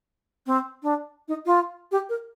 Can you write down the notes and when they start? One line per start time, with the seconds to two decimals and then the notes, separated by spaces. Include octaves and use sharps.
0.46 C4
0.83 D4
1.28 D#4
1.46 F4
1.92 G4
2.09 A#4